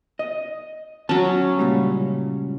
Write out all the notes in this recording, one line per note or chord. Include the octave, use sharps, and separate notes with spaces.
D#5
F#3 C#4 A5
C#2 A#2 G3